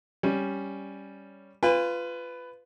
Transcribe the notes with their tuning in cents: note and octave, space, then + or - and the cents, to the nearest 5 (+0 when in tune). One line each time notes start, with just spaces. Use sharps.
G3 +0 C#4 +0
F4 -10 B4 +15 G#5 -45